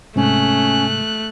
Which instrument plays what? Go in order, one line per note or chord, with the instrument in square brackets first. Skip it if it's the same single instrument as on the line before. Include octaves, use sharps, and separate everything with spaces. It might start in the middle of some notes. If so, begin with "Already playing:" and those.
[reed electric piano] G#2 C3 G#3 [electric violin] A3 F#6 [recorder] C#4